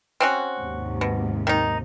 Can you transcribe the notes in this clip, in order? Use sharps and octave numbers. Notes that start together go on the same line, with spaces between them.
C4 C#4 F#4
D#2 G#2 C3
B2
D#3 D#4